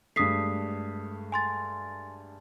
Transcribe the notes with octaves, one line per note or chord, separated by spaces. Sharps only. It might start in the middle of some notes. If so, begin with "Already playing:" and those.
G2 G#3 A3 D#6 B6 C7
G#5 C6 A6